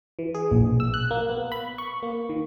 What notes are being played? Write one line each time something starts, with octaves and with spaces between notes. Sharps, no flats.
E3
G#4
A#1
B1
E6
F#6
A#3
B3
B5
C#6
A#3
D#3